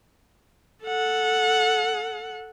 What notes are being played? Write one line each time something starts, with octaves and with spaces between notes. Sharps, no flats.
A4 F#5